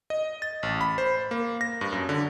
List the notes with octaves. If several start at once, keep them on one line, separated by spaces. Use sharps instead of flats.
D#5
A6
A1
B5
C5
A#3
A#6
G2
F#2
D3